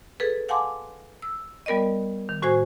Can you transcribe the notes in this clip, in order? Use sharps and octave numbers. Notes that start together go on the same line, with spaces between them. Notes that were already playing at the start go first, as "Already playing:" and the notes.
G#4 A4 B4
F5 F#5 G#5 A5 C6 D6
E6
G3 B3 A#4 D5 D#5
D#3
A2 F#4 C5 G#5 G#6